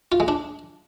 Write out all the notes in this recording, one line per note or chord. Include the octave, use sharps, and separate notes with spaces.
F4
G#3
D4